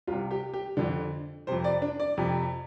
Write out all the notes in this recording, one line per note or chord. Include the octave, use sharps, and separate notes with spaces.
C2 C3 F4
G4
G4
F2 D3 D4
F2 C3 C5
D5
D4
D5
F2 C3